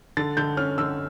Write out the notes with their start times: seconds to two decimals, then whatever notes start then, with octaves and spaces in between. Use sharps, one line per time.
0.17 D3 A6
0.37 D3 G6
0.57 C#4 F6
0.78 D3 E6